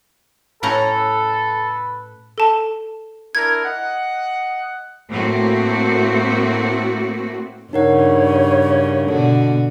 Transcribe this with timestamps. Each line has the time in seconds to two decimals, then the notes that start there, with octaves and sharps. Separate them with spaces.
0.63 A2 C#4 A4 B4 A#5
2.38 A4 A5
3.35 D4 E4 A#4 G#6
3.64 D#5 F#5
5.08 A2 A3 A#3 C4 F#4
7.73 G2 C#3 D#4 A#4 C#5 F#5
9.09 B2 D3 F#4 A4